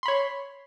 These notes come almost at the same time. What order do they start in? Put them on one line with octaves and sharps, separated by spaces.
C6 B5 C#5